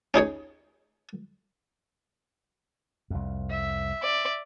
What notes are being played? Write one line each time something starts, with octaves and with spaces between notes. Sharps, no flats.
C#4 D#4 G#4 C#5
C2 F2
E5
D5